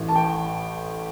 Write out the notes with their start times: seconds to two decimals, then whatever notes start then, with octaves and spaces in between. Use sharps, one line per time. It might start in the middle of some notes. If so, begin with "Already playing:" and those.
Already playing: A1 A2 E3
0.08 A5
0.16 G5